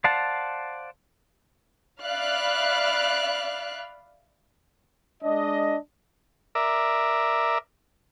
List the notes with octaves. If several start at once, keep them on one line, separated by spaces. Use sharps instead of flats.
C5 D5 F5 F#5 A5
D5 E5 F5 B5 F6 F#6
G#3 D4 D#5
A#4 D5 E5